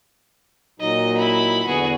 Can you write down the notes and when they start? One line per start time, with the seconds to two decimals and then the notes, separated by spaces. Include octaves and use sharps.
0.80 A#2 F#3 D#4 D#5
1.17 E4 B5
1.65 E2 D3 B3 F#4 G#4